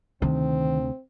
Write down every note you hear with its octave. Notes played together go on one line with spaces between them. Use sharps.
D2 C3 D#3 C4